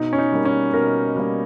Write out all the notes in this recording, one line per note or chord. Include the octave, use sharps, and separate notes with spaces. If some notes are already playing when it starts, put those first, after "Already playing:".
Already playing: B2 D#4
C#4
D#4
G3 A#3
C#4
B2 A#4
G3 A#3